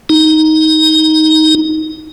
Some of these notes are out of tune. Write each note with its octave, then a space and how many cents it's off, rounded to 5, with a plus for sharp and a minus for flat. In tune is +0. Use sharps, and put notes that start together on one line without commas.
D#4 +10